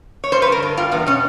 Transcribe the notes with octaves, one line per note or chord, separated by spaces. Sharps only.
C#5
G2 C5
B4
D3 A#4
G2
G3 F4
E2 B3
B2 C#4